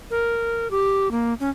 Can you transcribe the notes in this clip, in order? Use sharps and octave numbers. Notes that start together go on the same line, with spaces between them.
A#4
G4
A#3
C#4